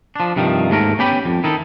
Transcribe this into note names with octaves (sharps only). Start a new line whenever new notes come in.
F3 D4
G2 C3 D#3 F3
D#2 G#2 A3 A#4
B3 C#4 G4 B4 G5 B5
F2
D#3 D#4 E4 A4